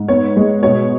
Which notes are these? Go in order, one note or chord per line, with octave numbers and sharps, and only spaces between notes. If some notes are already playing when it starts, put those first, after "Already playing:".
Already playing: G#2
B3 C#5
G#3
B2 C#5